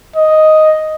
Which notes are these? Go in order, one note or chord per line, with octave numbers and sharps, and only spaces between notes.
D#5